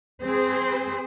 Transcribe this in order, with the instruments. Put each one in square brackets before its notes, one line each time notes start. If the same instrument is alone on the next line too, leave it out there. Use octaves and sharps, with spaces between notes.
[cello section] C4 G#4 C5